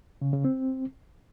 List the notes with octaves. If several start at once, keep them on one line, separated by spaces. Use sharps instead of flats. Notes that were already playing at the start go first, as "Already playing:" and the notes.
C#3
C#3
C4